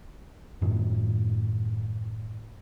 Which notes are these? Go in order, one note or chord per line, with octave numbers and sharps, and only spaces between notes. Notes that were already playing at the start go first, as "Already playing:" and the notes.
F#2 A2 D#3